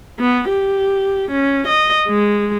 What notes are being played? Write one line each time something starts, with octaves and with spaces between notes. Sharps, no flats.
B3
G4
C#4
D#5
G#3